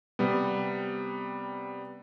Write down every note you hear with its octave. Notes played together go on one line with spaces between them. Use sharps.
C3 G3 B3